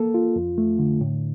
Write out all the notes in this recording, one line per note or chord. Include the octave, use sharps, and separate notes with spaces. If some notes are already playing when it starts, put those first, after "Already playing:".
Already playing: A#3 A4
F4
F2
A3
D3
A2